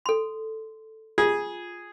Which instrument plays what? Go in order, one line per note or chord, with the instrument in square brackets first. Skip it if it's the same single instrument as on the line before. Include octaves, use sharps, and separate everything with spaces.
[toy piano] A4 C6
[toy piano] F4 [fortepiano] G#4